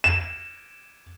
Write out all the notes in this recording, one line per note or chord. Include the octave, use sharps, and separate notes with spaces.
E7